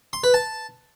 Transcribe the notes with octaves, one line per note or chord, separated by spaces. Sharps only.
C6
B4
A5